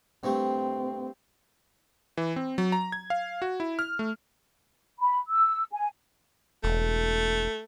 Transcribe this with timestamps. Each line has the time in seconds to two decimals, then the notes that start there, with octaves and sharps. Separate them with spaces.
0.24 G2 A3 C4
2.17 E3
2.36 C4
2.58 F#3
2.72 A#5
2.92 G#6
3.10 F5
3.42 F#4
3.60 E4
3.79 F6
3.99 A3
5.00 B5
5.28 E6
5.72 G#5
6.64 E1 A3